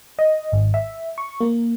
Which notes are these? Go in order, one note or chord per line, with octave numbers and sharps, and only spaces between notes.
D#5
G#1
E5
C#6
A#3